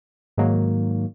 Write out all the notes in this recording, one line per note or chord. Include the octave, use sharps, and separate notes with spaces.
G#2 D#3 F#3 A#3